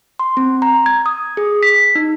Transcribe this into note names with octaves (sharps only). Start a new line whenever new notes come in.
C6
C4
A#5
G#6
D#6
G#4
B6
D#4